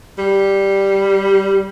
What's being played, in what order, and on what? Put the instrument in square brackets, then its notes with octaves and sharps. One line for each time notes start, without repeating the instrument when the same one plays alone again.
[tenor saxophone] G3